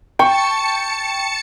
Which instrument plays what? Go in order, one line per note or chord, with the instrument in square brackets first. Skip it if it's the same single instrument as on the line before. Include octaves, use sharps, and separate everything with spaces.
[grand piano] G5 [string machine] A5 C#7 [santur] C#6